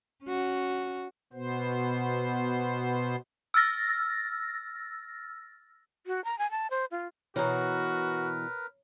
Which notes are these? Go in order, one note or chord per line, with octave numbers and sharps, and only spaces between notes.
C#4 F#4
B2 B3 C5
E6 F6 A6 A#6
F#4
A#5
G#5
A5
C5
F4
B2 E3 F#4 A#4 B4 C#5 A#5